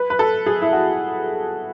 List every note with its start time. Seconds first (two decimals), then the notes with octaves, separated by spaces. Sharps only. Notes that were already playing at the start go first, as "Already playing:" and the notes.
Already playing: B4
0.10 B4
0.19 A4
0.46 G#4
0.62 E4
0.73 F#4